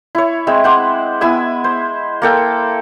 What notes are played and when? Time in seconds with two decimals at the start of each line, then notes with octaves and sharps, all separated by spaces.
0.15 E4 C#5
0.47 G#3 C4 E5
0.64 C5 F#5 D6
1.21 B3 E4 G#5 E6
1.64 C5
2.22 A#3 A4 G5